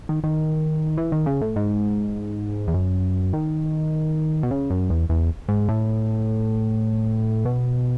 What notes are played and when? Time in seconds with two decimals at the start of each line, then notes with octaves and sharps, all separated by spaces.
0.09 D#3
0.24 D#3
0.97 E3
1.12 D#3
1.26 C#3
1.41 A2
1.56 G#2
2.68 E2
2.74 F#2
3.33 D#3
4.43 B2
4.51 C#3
4.70 F#2
4.90 E2
5.09 E2
5.49 G#2
5.69 A2
7.45 B2